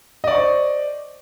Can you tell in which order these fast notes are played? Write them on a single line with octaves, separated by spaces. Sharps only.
D#5 D5 C#6 C5